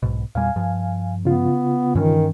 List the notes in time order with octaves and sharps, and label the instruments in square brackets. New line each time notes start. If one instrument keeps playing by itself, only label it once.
[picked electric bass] B1 G#2 B2
[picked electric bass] E2 A#2 G3 [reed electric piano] F5 G#5
[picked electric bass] G2 F3
[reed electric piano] C#3 F4 [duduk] B3
[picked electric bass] G2 E3 C#4 [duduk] D#3